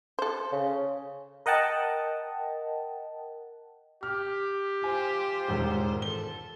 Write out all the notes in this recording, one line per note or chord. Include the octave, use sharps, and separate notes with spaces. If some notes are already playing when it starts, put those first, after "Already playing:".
A4 C5
C#3
A#4 D#5 F#5 G5 A5
G4 F6
F4 C5 G#5
E1 G#2 D#3
A4 G7